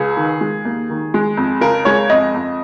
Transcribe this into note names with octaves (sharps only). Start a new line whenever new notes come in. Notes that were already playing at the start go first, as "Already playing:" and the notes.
Already playing: C#2 G#4
D#3
G#3
D#2
D#3
G#3
F2
C#3 A#4
G#3 C#5
F2 D#5
F2